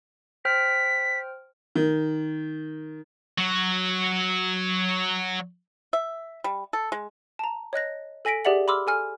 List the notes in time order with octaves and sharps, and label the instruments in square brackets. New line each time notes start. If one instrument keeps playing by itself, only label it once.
[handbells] C5 G5 F6 [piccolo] B6
[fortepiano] D#3
[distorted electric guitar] F#3 F#4
[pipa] E5
G3
A4
G#3
[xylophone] A5 A#5
C#5 D#5 F#6 A#6
A4 G#5 A#6 B6 D7
G4 G#4 D5 E5 F#5 F#7
B5 C6 D6 E6 F6
A4 G#5 F6